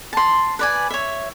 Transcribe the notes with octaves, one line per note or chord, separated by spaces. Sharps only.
A5 C6
B4 D5 G#5
C#5 E5